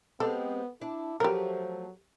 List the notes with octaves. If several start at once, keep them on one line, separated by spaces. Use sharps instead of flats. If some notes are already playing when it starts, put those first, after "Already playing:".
G#3 B3 C4 G4 A4
D4 E4
F3 F#3 A3 G4 A#4